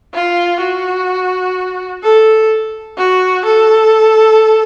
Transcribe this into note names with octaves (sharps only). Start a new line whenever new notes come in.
F4
F#4
A4
F#4
A4